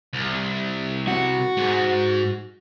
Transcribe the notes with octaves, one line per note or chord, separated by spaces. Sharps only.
C2
F#4
G#2